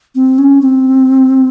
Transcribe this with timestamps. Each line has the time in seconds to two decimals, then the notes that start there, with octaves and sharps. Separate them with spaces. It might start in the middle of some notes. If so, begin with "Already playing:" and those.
0.15 C4
0.38 C#4
0.61 C4